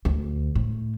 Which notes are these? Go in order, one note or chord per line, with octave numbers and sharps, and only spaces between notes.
D2
A2